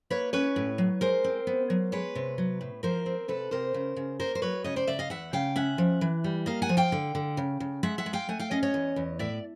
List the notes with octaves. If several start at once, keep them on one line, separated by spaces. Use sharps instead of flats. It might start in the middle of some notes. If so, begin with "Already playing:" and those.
A#3 B4 C#5
C#4 B4 C#5
A2
F#3
G#3 A#4 C5
C4
B3
F#3
G#3 B4 C#5
C3
F#3
A2
F3 A#4 C5
C4
C3 A4 B4
C3 A#4 C5
C#3
C#3
A#3 A#4 C5
C5
F#3 B4 C#5
C#3 C#5 D#5
C5 D5
C#3 D5 E5
D#5 F5
E2 E5 F#5
C#3 F5 G5
C#4 E5 F#5
F3
E3
G3
A#3 D#5 F5
F#5 G#5
F3
F5 G5
D3
D3
C#3
C#3
G#3 E5 F#5
E5 F#5
G#3
F5 G5
A3 F#5 G#5
F5 G5
C#4 D#5 F5
C#5 D#5
E2
E2
A2 D5 E5